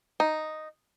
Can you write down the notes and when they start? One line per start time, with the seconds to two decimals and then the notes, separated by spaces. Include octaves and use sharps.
0.20 D#4